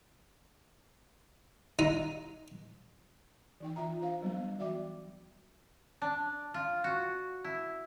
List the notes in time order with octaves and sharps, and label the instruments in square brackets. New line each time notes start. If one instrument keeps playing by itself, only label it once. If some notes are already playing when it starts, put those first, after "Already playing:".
[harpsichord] D#4
[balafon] E3 D#4 G5
E3 F4 E5 A#5
D4 C5 F5
F#3 G3 B3 D4
E3 F#4 D5 E5 G5 D6
[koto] D4
F4
F#4
E4